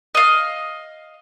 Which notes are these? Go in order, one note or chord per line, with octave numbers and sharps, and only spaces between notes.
D#5 F5